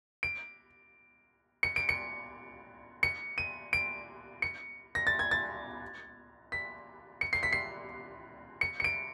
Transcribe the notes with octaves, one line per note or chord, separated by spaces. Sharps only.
D7
C#7
D7
C#7
C#7
D#7
D7
C#7
A#6
A6
G#6
A6
B6
C#7
C7
B6
C7
C#7
C#7
D7